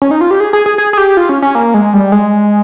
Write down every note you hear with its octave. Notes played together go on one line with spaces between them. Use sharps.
C#4
D#4
F4
G4
G#4
G#4
G#4
G#4
G#4
G4
F4
C#4
C#4
A#3
G#3
G3
G#3